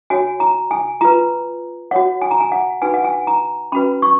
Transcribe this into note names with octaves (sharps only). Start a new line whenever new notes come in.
F#4 C#5 G#5
A#5
G#5
F4 B4 A#5
F#4 C#5 F#5
G#5
A#5
G#5
F#5
D#4 F#4 B4 G#5
F#5
G#5
A#5
C#4 F#4 B4 B5
C#6